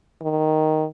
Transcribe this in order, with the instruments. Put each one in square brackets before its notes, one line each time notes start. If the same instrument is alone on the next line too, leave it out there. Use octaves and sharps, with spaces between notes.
[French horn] D#3